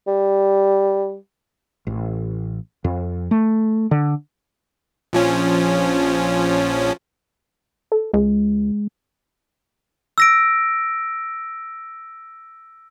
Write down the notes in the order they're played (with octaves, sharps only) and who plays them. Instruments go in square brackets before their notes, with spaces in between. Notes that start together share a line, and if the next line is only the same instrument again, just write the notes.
[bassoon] G3
[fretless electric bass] A1
F2
A3
D3
[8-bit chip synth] A#1 F3 C#4
[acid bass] A4
[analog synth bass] C#2 [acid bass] G#3
[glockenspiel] E6 A#6 D7